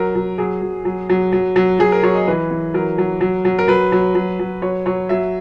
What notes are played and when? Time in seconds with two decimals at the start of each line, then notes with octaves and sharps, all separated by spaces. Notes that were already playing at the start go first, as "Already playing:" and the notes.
Already playing: F#3 A#4
0.15 F#3
0.38 F#3 G#4
0.62 F#3
0.85 F#3
1.10 F#3
1.33 F#3
1.56 F#3
1.79 F#3 G#4
1.92 A#4
2.03 F#3 C#5
2.15 D#5
2.28 E3 B4
2.51 E3
2.74 F#3 A#4
2.98 F#3
3.21 F#3
3.45 F#3
3.59 A#4
3.68 F#3 B4
3.92 F#3
4.15 F#3
4.39 F#3
4.62 F#3 C#5
4.86 F#3 C#5
5.09 F#3 E5